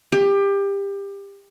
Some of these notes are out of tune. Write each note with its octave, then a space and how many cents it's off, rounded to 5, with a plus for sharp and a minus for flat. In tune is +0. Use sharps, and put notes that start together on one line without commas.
G4 +25